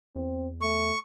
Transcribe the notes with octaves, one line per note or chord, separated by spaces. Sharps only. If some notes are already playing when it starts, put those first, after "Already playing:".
E2 C4
A3 C#6